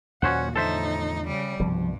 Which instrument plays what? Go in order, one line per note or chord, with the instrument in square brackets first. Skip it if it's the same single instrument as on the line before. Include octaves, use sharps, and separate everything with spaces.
[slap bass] D#2 A#2 F#3 [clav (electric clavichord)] C#4 C5 F#5 [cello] F#4
[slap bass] E2 D3 F3 [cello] A2 D#4 [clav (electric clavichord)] A4 C5 E5
[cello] C#3 G3
[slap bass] C2 B2 [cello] G2 [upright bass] F3